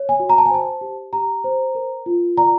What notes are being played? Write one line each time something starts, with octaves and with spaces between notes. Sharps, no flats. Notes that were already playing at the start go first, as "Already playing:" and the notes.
Already playing: C#5
G#5
F#4
A#5
A5
G#5
C5 A5
G4
G4 A#5
C5
A#4
F4
D5 A#5